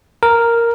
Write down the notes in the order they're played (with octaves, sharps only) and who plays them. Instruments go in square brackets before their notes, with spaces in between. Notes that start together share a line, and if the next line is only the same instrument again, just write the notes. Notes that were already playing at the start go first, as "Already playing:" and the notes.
[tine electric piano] A#4